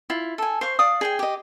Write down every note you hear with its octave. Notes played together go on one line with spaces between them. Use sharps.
E4 F4
A4 G#5
C5 F5 C#6
D5 F5 D#6
G#4 G5 G#5
G4 D#5